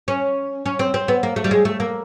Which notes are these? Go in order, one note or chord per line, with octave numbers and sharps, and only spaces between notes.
C#4
C#4
C4
C4
B3
A#3
A3
G3
G#3
A3
A#3